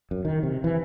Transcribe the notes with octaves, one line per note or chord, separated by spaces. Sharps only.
F#2
D#3
C3
E3